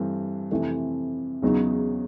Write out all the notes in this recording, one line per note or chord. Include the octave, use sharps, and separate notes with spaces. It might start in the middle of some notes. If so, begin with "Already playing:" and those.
Already playing: G2 E3 A3 C4
F2 C3 E3 A3
E2 C#3 F#3 B3 D#4